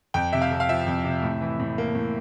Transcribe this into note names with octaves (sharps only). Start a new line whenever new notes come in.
F2 G5
C3 E5
F5
F2
F5
F3 E5
F2
C3
A2
E3
A2
A#3
A2